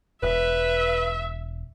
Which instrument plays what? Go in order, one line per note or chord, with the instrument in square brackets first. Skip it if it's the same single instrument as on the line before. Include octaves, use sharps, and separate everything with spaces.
[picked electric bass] E1 [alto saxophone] B4 [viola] E5